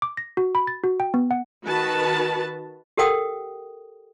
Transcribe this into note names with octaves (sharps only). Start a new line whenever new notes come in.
D6
A#6
F#4
B5
A6
F#4
G5
B3
F#5
D#3 F#4 B4 A5
G4 A4 A#4 F#5 G5 D#6